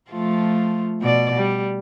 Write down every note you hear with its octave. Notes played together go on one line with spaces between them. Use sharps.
F3 A3 F4
B2 D5
G3